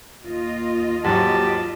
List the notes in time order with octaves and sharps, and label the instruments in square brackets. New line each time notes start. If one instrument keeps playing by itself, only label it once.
[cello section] D#2 F4 D#5
[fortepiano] G#2 F3 F#3 [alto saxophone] G4 [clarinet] A5